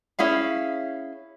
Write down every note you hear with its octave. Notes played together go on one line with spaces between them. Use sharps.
C#4 E4 G#4 F5